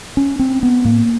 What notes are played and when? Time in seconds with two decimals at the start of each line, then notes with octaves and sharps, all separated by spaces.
0.17 C#4
0.39 C4
0.63 B3
0.85 A2 A#3